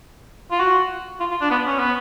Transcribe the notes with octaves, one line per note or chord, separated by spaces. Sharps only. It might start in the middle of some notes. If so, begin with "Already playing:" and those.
F4
F#4
F4
F4
D4
B3
C#4
B3